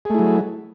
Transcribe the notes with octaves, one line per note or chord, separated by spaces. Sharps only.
F#3 A3 E4 G#4